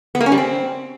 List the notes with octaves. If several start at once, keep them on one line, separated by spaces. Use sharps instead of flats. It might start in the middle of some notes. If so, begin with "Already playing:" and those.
B3
A#3
C#4
G3
C4